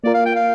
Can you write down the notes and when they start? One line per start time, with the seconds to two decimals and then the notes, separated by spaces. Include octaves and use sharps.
0.04 A#3 F4 A#4 D5
0.14 F5
0.26 G5
0.36 F5